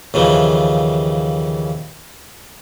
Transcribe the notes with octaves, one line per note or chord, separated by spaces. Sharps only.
D#2 C#3 E3 F3